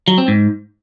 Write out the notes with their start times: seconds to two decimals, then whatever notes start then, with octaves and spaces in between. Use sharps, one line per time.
0.08 F#3
0.18 C4
0.28 G#2